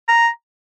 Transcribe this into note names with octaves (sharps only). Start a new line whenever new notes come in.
A#5